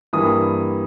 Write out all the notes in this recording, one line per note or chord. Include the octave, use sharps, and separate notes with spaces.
G2 E3 G3 A#3 D#6